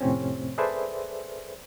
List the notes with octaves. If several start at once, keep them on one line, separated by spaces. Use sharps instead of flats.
F2 A2 C3 C4 C#4
G#4 A4 B4 C5 D5 E5